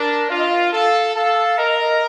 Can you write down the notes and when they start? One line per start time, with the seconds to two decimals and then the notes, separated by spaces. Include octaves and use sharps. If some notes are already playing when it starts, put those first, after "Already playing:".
Already playing: D4 A#4
0.29 F4 F5
0.38 D#5
0.46 F5
0.72 A4 F5
1.15 A4 F5
1.58 A#4 D#5
1.79 D#5